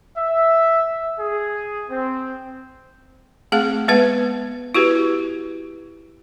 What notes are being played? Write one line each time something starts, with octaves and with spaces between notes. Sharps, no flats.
E5
G#4
C4
A3 C4 G#4 F5
G#3 B3 B4 F#5
E4 F#4 G4 B4